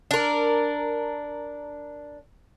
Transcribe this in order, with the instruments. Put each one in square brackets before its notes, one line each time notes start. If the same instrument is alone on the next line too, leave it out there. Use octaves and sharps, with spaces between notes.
[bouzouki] D4 A#4